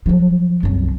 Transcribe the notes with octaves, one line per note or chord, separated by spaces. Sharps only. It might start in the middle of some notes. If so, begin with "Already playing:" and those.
F3 F#3
C2 F#2